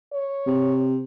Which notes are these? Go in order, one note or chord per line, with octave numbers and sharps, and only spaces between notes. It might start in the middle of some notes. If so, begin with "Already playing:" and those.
C#5
C3